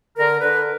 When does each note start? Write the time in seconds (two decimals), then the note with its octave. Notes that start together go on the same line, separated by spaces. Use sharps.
0.18 D3 A#4
0.41 D3 B4